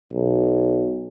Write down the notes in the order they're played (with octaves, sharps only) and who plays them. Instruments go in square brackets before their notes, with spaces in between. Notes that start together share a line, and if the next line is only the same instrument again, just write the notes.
[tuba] B1